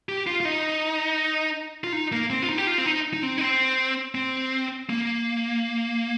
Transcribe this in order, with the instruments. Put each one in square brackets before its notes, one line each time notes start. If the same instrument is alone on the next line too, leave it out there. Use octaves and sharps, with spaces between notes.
[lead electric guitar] G4
F4
F4
D#4
F4
D#4
A#3
C4
F4
D#4
G4
F4
C4
D#4
D#4
C4
D#4
C4
C4
A#3